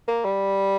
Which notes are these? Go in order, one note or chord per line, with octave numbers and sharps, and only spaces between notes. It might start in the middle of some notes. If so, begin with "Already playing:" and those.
A#3
G3